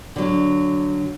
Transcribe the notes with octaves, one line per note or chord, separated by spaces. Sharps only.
D3 F#3